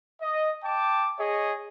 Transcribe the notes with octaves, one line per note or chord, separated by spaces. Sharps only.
D#5
G5 A5 D6
G#4 C#5 D#5